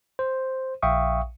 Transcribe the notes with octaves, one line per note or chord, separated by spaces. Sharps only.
C5
A#1 E5 F5 G5 C#6 D#6